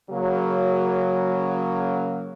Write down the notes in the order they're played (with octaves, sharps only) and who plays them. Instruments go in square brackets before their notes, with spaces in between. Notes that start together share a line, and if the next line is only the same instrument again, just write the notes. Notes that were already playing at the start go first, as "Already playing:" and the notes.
[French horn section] C#3 F#3 A#3